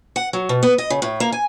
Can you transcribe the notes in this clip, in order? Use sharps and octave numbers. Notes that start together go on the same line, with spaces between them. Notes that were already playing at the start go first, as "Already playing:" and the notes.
F#5
F#3
B2
B3
D#5
C#3
A2
A#3
G#5